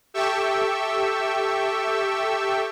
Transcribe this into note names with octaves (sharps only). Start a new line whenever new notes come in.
G4 A4 E5 G5 C#6 E6